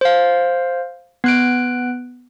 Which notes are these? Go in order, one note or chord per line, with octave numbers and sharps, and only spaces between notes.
C5 F5
B3 F#6 D7